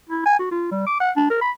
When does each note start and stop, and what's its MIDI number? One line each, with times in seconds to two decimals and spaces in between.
0.09 0.25 64
0.26 0.37 80
0.39 0.49 66
0.51 0.71 65
0.71 0.85 55
0.87 0.96 86
1.00 1.11 78
1.16 1.30 62
1.30 1.39 70
1.41 1.51 83